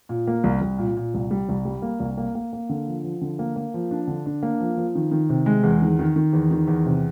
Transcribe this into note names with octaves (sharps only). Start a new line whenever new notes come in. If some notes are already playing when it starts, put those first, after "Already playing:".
A#2
A#3
C2
C2
A#2
A#2
C2
G3
C2
G3
A#3
C2
A#3
A#3
A#3
D3
F3
F3
D3
A#3
A#3
F3
D4
D3
D4
A#3
F3
F3
D#3
D#3
C3
G#3
E2
D#3
D#3
D#3
E2
D#3
E2
C3